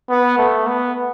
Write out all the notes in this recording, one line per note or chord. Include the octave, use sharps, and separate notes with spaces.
B3
A3
B3